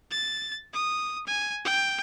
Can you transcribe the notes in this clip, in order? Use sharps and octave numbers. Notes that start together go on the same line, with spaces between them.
A6
D#6
G#5
G5